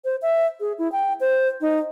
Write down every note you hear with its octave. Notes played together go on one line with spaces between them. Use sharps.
C5
E5
G#4
E4
G5
C5
D#4